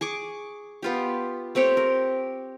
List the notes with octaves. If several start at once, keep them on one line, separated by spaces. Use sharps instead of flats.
G#4 C#6 D6
B3 F4 G4
A3 C4 G4 C#5
A#4